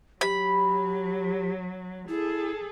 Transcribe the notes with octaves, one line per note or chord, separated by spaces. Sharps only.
F#3 G4 B5
E4 G#4 A4